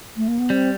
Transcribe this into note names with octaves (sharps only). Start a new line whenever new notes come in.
A3
A#3
B3
G3 C4